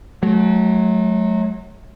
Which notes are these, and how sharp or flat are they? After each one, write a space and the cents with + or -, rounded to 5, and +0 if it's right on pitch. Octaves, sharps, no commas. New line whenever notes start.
F#3 +0 A3 -35